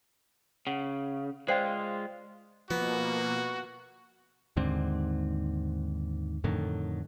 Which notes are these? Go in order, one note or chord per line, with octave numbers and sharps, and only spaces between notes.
C#3 F#5
G#3 F4 C5 D5 F5 G5 C7
B2 F3 A#3 B3 F#4
D#2 G#2 D3 C4
F2 A2 D3 D#3